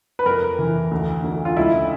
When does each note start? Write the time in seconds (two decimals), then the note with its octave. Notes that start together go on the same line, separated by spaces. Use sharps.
0.19 B4
0.26 F2 A#4
0.59 E3
0.91 D2
1.24 D2
1.45 F4
1.57 C#2 E4